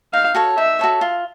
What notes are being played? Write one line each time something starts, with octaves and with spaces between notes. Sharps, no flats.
D#4 F5
F#4 A4 C#5
D#4 E5
F#4 A4 C#5
F4